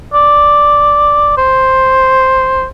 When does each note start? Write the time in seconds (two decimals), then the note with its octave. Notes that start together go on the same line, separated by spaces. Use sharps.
0.14 D5
1.38 C5